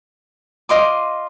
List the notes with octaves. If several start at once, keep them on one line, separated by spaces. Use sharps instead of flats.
F4 D#5 C6 D6